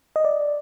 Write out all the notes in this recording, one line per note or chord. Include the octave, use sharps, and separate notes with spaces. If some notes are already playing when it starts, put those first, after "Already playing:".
D#5
D5